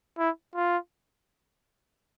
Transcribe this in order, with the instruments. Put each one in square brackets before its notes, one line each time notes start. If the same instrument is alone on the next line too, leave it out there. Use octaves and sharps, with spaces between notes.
[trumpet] E4
F4